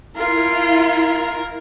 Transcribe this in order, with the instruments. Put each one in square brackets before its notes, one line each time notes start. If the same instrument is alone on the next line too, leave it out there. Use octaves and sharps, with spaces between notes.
[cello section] E4 [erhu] F4 [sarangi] A#4